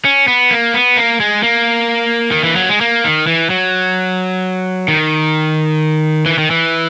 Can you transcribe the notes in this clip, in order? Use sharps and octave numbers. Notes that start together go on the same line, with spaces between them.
C#4
B3
A#3
B3
A#3
G#3
A#3
D#3
E3
F#3
G#3
A#3
D#3
E3
F#3
D#3
E3
D#3
E3